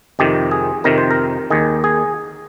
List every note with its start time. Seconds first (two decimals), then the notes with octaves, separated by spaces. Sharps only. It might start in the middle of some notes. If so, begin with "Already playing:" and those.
0.19 F2 C3 D#3 G4
0.51 G#4
0.84 F2 C3 D#3 A#4
0.98 C5
1.11 A#4
1.50 D#2 D#3 G#4
1.84 G#4